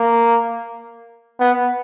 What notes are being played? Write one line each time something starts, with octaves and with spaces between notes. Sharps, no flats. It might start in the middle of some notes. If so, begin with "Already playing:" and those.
Already playing: A#3
B3